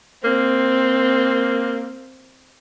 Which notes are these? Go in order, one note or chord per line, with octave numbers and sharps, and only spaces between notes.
A#3 C4